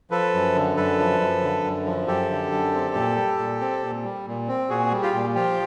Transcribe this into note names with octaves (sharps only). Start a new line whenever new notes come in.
F3 A4 B4
F#2
D3
F#2 A4 B4
F3
F#2
D3
F#2
F3
F#2 G4 A4
D3
F#2
C4
A#2
G3
A#2
C4
A#2
G3
A#2
C4
A#2 F#4 G#4
G3
F4 G4
A#2
F3 F4 G4